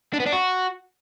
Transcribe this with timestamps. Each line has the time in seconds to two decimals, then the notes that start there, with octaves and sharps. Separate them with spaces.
0.14 D4
0.20 B3
0.26 D4
0.33 F#4